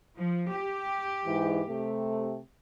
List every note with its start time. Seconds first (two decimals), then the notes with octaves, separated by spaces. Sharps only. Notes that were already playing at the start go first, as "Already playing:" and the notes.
0.18 F3
0.52 G4
1.25 G#2 E3
1.68 C3 A3